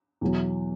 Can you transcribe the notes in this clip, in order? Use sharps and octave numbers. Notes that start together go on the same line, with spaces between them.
E2 B2 F#3